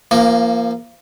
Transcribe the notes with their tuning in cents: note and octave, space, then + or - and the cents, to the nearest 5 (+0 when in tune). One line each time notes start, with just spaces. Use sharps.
F3 -30 A#3 +0